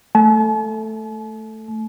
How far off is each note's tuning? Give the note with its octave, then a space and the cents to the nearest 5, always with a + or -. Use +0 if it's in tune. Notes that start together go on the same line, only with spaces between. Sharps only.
A3 +0 A5 -45